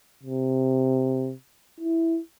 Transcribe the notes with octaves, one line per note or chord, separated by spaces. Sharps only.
C3
E4